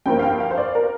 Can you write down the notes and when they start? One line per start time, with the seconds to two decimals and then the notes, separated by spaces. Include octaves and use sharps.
0.06 G2 F3 A#3 G5
0.19 F5
0.23 G5
0.40 F5
0.50 C5
0.58 D5
0.75 A#4